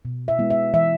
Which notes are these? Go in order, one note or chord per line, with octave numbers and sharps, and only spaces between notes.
B2
E5
G#3 B3 E4
E5
E3 E5